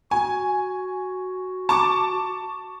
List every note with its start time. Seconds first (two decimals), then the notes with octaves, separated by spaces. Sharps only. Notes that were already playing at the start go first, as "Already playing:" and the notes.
0.11 F#4 G#5
1.69 A5 C#6 D6